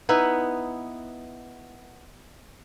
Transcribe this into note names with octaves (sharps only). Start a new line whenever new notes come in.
B3 D#4 E4 B4